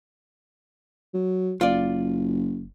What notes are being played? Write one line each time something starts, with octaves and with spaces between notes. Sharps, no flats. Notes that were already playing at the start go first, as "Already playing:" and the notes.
F#3
F#1 F4 D5